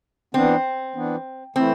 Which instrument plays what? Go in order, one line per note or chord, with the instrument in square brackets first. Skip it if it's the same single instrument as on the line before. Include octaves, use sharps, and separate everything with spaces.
[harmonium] E3 B3 D4 [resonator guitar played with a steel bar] C4
[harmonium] E3 B3 D4
[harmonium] E3 A3 E4 [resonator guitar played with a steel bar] C4